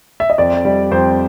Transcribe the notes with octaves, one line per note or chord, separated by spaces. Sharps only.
E5
D#5
F2 D5
G3
F2 C5